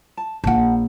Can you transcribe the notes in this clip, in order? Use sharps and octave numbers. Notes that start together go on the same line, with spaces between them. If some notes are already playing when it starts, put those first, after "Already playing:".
A5
A#1 F4 F#5 A5